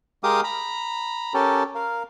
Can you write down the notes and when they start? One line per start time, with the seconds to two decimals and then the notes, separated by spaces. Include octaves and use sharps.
0.24 G#3 G4 A#4 F5 D6 D#6
0.44 A#5 B5
1.34 C#4 G4 A4 A#4
1.75 A#4 F5